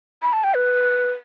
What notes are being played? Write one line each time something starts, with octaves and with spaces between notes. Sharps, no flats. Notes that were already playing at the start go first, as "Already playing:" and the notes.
B5
A5
G5
B4